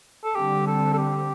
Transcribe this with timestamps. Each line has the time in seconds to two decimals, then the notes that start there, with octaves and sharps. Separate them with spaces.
0.24 A4
0.35 D3 G3 C4 G4
0.67 A4
0.93 A4
0.98 G4